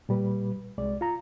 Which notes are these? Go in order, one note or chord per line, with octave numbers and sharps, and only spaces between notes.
A#2 G3 B4
C2 G#3 D5
F4 A#5